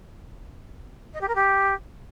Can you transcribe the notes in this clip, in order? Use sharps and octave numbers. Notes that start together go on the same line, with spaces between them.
D#5
G4
A#4
G4